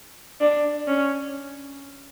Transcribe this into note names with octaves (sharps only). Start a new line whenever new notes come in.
D4
C#4